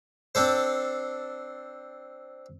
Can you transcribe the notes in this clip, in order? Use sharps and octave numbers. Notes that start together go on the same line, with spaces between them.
C4 D4 A4 C5